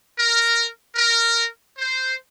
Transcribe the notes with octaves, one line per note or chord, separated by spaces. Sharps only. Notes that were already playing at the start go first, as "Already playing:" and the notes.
A#4
A#4
C5